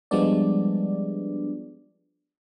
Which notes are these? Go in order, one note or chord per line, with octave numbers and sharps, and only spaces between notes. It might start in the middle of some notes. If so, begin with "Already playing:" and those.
F3 G3 G#3 B3 D4 D5